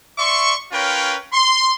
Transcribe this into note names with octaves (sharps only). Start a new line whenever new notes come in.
D5 E5 C6 C#6
C#4 F4 A#4 B4 C#5 G5
C6